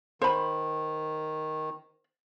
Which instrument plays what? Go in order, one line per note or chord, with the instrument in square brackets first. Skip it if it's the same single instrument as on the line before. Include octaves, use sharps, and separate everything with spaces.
[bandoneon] D#3 [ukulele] C5 B5